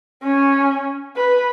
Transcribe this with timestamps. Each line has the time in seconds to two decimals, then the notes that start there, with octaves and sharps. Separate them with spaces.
0.23 C#4
1.16 B4